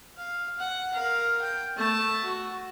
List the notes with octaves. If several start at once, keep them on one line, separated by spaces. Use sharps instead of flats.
F5
F#5
A#4 F5
G5
A3 A5
F#4